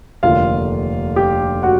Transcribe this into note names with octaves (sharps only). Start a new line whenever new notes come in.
F1 D#2 D3 F4 F5
G4 G5
F#4 F#5